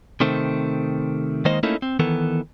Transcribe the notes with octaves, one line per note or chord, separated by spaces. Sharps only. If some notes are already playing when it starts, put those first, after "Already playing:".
C3 D#3 A3 C4
D#3 G#3 A#3 D#4 C5 D#5
A3 A#3 C#4 D#4 E4 A4
C4
D#3 E3 B3 A4